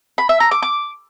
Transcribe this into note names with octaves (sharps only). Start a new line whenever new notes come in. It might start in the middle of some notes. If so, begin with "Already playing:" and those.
B5
E5
A#5
D6
D6